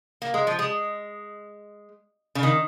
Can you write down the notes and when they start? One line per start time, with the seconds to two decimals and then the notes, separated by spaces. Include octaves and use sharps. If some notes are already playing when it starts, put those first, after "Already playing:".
0.22 A#3
0.34 G#3
0.47 F3
0.59 G#3
2.35 C#3
2.43 D#3